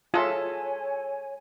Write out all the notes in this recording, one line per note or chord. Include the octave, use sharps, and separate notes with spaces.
G#3 F4 A4 C#5 E5 G#5